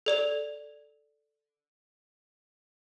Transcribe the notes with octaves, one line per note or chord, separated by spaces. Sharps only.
A4 D5 F7